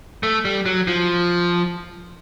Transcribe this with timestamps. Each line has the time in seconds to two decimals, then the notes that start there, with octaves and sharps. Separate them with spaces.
0.23 A3
0.45 G3
0.66 F#3
0.87 F3